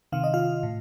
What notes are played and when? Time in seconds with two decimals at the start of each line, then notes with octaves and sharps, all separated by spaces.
0.12 C3 D#3 F5
0.24 D#5
0.34 F4 F5
0.63 A2